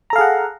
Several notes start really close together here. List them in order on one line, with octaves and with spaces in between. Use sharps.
A#5 A4 F5 G#4 F#5